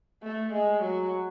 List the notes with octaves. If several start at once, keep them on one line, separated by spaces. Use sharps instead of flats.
A3
G#3
F#3